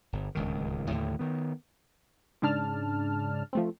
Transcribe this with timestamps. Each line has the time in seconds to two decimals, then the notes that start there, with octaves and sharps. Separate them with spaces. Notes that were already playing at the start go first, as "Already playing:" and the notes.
0.13 G1
0.35 D1 C#2 D#3
0.90 D#2 A2 D3
1.19 D#3 B3
2.42 G#2 C#3 D4 A5 F6
3.53 F3 A3 C4